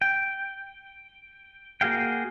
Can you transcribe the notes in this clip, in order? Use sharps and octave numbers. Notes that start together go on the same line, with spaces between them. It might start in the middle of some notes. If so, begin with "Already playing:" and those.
G5
A#3 F#4 G#4 F5 G5